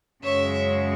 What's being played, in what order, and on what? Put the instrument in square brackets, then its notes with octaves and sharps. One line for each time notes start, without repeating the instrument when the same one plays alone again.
[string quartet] F#2 C#3 G#3 C#5 E5